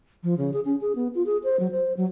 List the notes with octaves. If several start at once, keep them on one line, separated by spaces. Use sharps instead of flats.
F3
C#3
G#4
C#4
G#4
B3
F4
G#4
C5
F#3
C5
F#3